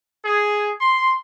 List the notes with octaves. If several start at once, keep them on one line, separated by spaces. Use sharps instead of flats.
G#4
C6